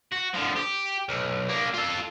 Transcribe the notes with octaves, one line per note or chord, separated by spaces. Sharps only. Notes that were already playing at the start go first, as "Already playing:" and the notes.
F#4
D3 F3
G4
B1
A#3 D4
F4 A4